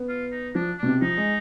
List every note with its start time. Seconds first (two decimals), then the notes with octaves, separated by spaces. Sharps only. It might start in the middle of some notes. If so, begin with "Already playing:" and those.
Already playing: B3
0.09 F4
0.32 D#4
0.55 F3 D4
0.79 B2 D4
0.86 C3
1.01 F3 D#4
1.17 G#3